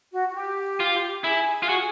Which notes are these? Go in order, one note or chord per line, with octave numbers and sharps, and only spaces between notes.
F#4
F#4
G4
F4
E4 G#4
F4
F#4